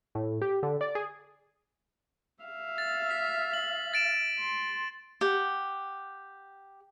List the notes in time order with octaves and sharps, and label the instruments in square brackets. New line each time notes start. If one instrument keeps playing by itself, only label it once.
[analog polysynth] A2
G4
D3
D5
G#4
[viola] E5 F5
[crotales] A6
B6
F#7
A6 D7 E7
[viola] C6
[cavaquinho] G4 F#5